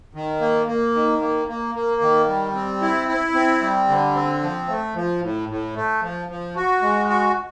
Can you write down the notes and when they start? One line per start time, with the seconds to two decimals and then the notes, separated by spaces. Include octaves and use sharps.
0.14 D#3
0.41 A#3
0.67 A#3
0.95 D#3
1.21 A#3
1.48 A#3
1.75 A#3
2.01 D#3
2.28 G3
2.55 C4
2.82 E4
3.08 E4
3.35 C4
3.62 G3
3.88 D3
4.15 C4
4.42 F3
4.69 A3
4.95 F3
5.22 A2
5.49 A2
5.75 A3
6.02 F3
6.29 F3
6.56 F#4
6.82 G#3
7.09 F#4